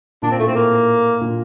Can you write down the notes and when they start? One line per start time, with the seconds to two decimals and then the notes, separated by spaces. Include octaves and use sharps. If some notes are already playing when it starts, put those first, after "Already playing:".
0.22 A#2 D4
0.31 C4
0.39 A2 A3
0.47 C4
0.55 A#3
1.21 A#2